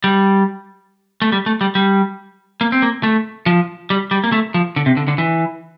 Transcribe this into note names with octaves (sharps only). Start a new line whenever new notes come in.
G3
A3
G3
A3
G3
G3
A#3
C4
A#3
A3
F3
G3
G3
A#3
A3
F3
D3
C3
D3
D3
E3